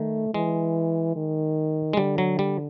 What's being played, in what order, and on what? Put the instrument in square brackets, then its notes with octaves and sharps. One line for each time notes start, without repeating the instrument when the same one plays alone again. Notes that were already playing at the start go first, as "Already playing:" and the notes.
Already playing: [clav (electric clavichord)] D#3 [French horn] A3
[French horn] E3 [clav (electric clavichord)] G#3
[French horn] D#3
[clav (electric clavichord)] G#3
[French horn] D3 [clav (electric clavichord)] G3
[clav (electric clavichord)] F#3
G3